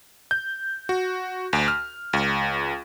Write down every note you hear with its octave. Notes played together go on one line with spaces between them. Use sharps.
G6
F#4
D2
F6
C#2